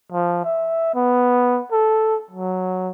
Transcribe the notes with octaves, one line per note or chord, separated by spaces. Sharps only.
F3
E5
B3
A4
F#3